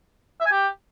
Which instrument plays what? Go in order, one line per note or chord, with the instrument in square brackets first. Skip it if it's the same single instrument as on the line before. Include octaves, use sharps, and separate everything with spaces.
[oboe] E5
G#5
G4